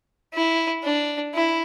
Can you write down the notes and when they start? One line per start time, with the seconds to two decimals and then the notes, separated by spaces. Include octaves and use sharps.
0.34 E4
0.84 D4
1.34 E4